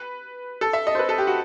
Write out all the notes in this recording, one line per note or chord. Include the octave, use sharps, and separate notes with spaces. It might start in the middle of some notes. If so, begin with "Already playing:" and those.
Already playing: B4
A4
E5
D#5
C5
B4
A4
G4
F#4